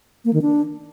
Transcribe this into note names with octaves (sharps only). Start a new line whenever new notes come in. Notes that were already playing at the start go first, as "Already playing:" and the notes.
A#3
D#3
D4